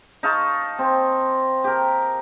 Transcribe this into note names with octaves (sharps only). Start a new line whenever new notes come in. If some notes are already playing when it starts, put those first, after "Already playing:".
D#4 F5 A5 C#6
C4
G4 A#4